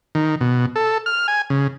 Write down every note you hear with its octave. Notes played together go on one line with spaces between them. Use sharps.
D#3
B2
A4
F6
G#5
C#3